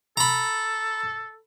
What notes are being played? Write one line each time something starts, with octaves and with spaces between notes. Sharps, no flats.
A4 A#5 B5